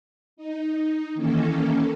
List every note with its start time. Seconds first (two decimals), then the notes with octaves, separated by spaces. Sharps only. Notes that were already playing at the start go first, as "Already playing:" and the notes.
0.37 D#4
1.14 D#3 E3 A#3 C#4 A4